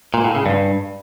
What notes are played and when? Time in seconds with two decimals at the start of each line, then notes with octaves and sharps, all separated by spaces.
0.14 A#2
0.24 A2
0.35 C#3
0.46 G2